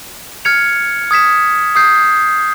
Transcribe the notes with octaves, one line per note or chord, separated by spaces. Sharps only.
F6 G#6 C#7 F7
D#6 G#6 B6 E7
D#6 G6 C7